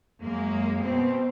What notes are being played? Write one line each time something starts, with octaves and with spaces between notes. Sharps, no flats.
F#2 G#3 A#3
B2 C4 C5